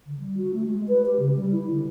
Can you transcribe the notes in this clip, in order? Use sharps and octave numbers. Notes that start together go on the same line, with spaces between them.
D3
G3
F#4
A3
G#3
B4
G4
C#3
G3
E4
D3